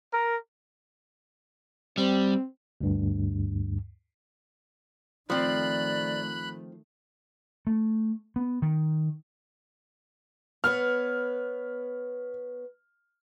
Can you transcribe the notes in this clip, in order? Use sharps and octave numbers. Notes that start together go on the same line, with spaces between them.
A#4
G3 C4
D2 G2
D#3 F3 A3 C4 D5 B5 F#6
A3
B3
D#3
B3 B4 C#5 F6